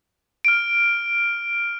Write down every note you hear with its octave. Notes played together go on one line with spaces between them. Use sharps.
F6 D7